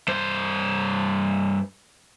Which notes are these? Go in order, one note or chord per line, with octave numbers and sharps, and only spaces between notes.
G2 C5